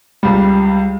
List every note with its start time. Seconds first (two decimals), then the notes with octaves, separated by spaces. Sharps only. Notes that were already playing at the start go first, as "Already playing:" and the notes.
0.23 C#2 G3